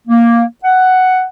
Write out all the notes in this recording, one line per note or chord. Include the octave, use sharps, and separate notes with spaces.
A#3
F#5